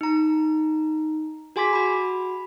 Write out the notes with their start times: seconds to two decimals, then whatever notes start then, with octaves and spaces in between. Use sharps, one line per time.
0.01 D#4 A#5
1.56 F#4 G#4 G#5 C6 D6 B6
1.73 F#4 B5